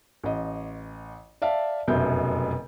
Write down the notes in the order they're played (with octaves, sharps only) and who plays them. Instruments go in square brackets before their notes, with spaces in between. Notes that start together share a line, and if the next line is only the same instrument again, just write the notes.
[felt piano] A1 D#5
D5 E5 F5 A5
F1 F#2 B2 E5 G6